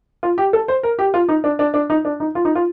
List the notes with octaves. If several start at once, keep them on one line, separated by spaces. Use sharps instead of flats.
F4
G4
A4
C5
A#4
G4
F4
D#4
D4
D4
D4
D#4
D4
D#4
F4
D#4
F4